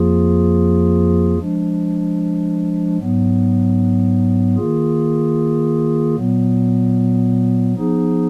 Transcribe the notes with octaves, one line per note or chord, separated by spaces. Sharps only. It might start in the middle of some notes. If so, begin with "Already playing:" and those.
Already playing: F2 F3 A#3 F4 G#4
F3 G#3 D4
G#2 F#3 B3
D#3 A#3 F4 G#4
A#2 F#3 B3
F3 B3 D#4 G#4